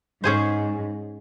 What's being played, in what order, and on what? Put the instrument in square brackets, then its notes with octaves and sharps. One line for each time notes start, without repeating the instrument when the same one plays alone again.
[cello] G#2 [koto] C#4 G#4 C5